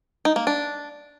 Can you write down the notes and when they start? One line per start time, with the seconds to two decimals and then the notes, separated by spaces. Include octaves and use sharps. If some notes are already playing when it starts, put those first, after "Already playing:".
0.25 D#4
0.36 A#3
0.47 D4